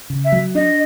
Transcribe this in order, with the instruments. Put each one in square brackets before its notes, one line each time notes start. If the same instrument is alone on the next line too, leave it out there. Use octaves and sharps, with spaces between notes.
[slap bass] C#3
[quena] E5
[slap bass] F#3
[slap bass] D4 [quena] D#5